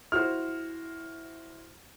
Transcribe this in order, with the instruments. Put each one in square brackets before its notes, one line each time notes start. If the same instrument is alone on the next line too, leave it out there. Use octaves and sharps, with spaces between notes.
[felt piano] E4 F#4 C5 [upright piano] F6